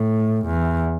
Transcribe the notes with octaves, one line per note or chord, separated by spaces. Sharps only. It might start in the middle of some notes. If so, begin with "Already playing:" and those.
Already playing: A2
E2